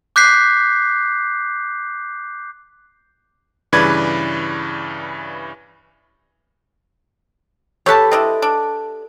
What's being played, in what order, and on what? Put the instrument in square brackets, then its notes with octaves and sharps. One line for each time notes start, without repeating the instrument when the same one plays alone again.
[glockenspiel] D6 F#6 G6 B6 C7
[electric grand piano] G2 C#3 E3 B4 D5 G#6
[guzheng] G4 A4 B4 [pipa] C#5 A5
[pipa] C4 D4 E4 [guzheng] D#5
[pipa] D4